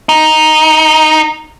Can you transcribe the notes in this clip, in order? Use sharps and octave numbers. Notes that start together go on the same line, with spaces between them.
D#4